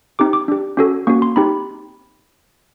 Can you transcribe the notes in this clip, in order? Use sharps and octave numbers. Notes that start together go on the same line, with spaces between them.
C4 D#4 G4 D6
D6
D4 G4
C#4 F#4 A4
A#3 C#4 F#4 C#6
C6
C4 D#4 G4 B5